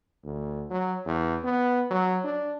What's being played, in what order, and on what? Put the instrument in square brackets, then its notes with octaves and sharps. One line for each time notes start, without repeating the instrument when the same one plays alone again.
[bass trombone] D2
F#3
E2
B3
F#3
D4